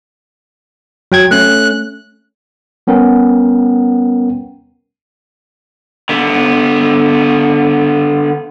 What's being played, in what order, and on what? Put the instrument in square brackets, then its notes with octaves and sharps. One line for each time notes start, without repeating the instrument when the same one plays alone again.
[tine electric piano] F#3 G5 G#6
[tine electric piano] A3 C#4 [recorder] F#6
[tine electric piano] G3 B3 C#4 A#4 F#5 G5
[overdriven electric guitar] D3 B3